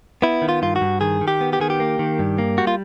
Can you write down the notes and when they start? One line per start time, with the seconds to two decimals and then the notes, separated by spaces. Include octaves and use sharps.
0.22 B3 E4
0.42 D#3
0.49 F4
0.62 G2 F4
0.76 F#4
0.81 G2
1.01 D#3 G#4
1.21 D#3
1.28 G4
1.41 B3
1.53 G4
1.60 D#3 G#4
1.70 G4
1.80 A#3
1.99 D#3
2.19 G2
2.38 A#3
2.58 G3 F#4
2.67 F4